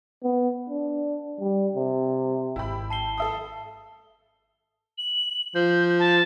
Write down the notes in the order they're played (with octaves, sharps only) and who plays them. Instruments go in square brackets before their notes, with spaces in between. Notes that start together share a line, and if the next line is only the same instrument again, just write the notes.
[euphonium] B3
D4
G3
C3
[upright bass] G#1 [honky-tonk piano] E4 G4 B5
[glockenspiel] A5 C7 G7
[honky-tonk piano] A4 E5 D#6
[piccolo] F#7
[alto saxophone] F3 [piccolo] G6
[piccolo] A5